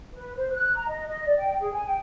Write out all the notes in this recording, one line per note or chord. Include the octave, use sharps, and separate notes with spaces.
B4
C5
F#6
A#5
D#5
D#5
D5
G5
G#4
G#5
G5